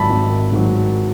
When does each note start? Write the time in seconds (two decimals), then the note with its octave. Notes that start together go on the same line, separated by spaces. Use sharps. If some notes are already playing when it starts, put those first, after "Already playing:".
Already playing: G#1 G#2 D#3 F#3 D5 E5 A5 B5
0.10 G#1
0.52 G#2 D#3 F#3